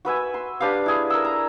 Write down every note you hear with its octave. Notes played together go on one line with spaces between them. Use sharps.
F#4 B4 E5 G#5
C6
D4 G4 B4 F5
E4 G#4
A#4 E6
A#5